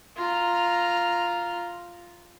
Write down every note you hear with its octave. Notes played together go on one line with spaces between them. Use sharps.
F4 A#5